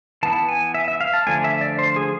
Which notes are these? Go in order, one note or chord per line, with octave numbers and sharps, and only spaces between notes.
E3 B3 E4 A5
G#5
E5
E5
F5
A5
D3 F3 A3 D4 G#5
E5
D5
C5
G#4